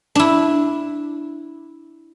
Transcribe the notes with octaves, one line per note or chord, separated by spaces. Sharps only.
D4 E4